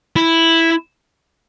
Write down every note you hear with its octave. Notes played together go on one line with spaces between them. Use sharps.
E4